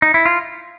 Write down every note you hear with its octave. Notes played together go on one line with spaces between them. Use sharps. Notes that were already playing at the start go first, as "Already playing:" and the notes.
D#4
E4
F4